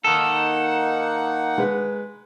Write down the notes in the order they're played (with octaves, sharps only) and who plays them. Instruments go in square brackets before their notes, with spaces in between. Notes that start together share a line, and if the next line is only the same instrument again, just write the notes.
[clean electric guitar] D#3 A4 [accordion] A#3 D#4 F#5
[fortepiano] G#3 B4